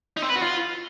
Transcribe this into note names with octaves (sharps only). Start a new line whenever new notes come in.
D#4
C4
B4
F#4
F4